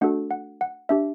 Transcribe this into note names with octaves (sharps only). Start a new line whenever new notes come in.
A3 D4 F#4 A4 F#5
F#5
F#5
D4 G4 E5